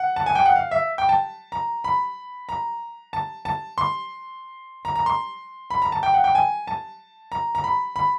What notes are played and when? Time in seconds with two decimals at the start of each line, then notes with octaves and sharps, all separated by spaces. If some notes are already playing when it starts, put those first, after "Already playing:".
Already playing: F#5
0.16 A5
0.26 G#5
0.35 G5
0.46 F#5
0.56 F5
0.71 E5
0.98 G5
1.09 A5
1.52 A#5
1.84 B5
2.49 A#5
3.13 A5
3.45 A5
3.78 C6
4.85 A#5
4.95 A#5
5.06 C6
5.70 B5
5.82 A#5
5.92 A5
6.03 G5
6.14 F#5
6.24 G5
6.35 G#5
6.67 A5
7.32 A#5
7.55 A#5
7.64 B5
7.96 B5